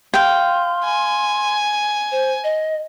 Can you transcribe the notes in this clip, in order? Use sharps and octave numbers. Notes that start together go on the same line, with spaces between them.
F5 G5 C6
G#5
C5
D#5